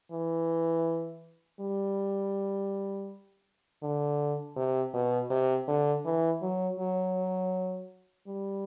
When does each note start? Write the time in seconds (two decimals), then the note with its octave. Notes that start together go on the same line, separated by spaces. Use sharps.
0.12 E3
1.60 G3
3.83 D3
4.56 C3
4.94 B2
5.31 C3
5.68 D3
6.05 E3
6.42 F#3
6.80 F#3
8.28 G3